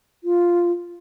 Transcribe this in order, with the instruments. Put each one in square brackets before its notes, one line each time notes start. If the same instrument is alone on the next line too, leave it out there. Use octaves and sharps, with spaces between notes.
[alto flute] F4